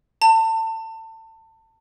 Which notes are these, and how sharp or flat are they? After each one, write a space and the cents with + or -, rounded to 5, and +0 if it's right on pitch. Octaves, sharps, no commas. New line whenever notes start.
A5 +30